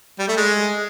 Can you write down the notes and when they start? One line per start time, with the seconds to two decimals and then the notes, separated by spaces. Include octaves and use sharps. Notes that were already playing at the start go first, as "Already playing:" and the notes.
0.19 G3
0.28 A3
0.37 G#3